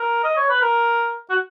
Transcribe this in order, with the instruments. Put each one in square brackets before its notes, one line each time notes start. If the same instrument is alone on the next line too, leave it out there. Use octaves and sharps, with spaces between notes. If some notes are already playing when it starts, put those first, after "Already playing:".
Already playing: [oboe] A#4
D#5
C#5
B4
A#4
F#4